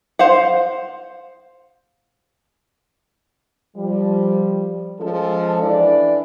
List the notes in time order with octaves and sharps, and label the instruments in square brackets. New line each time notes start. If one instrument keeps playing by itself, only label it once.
[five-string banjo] C5 F5 F#5
[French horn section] F3 G3
F3 G#3 C#4 F4 A4
E3 D4 E4 D5